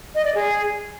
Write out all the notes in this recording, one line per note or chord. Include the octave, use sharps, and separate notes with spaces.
D#5
D5
G#4